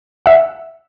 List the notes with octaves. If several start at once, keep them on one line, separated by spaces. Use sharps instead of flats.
E5 F#5